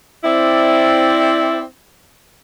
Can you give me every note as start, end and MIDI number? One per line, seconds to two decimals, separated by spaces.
0.24 1.61 60
0.24 1.61 64
0.24 1.61 74